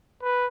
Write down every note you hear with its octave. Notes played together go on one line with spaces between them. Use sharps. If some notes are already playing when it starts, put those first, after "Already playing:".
B4